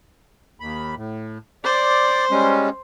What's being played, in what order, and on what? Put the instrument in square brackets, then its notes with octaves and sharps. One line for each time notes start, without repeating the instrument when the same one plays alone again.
[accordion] D#2 B5
A2
[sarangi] C5 [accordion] D5
[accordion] G3 G#3 C#4